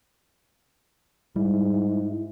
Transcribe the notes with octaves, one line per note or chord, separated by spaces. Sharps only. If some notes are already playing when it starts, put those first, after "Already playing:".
G#2 G3 E4